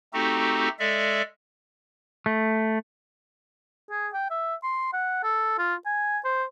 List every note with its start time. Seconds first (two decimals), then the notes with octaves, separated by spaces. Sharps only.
0.14 A3 C4 D#4 F#4 G4 A4
0.79 G#3 A4 D5 E5
2.26 A3
3.90 G#4
4.14 G5
4.30 E5
4.63 C6
4.93 F#5
5.24 A4
5.58 F4
5.86 G#5
6.25 C5